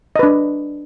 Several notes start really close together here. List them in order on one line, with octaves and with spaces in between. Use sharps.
D#5 B4 D4